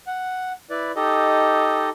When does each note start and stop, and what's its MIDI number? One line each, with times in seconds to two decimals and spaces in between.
0.07 0.53 78
0.70 0.91 64
0.70 0.91 71
0.70 0.91 74
0.96 1.90 63
0.96 1.90 67
0.96 1.90 69
0.96 1.90 75